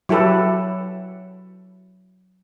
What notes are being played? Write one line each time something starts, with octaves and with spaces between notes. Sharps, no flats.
F#3 E4 G4 A4 B4